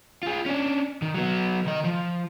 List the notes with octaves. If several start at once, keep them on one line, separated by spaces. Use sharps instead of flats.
F4 G#4
C#4 D4
D#3
F#3 B3
D#3 D#5
F3